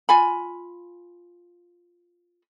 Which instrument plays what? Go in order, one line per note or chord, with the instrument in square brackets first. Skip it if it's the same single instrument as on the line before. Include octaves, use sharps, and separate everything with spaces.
[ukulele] F4 G#5 B5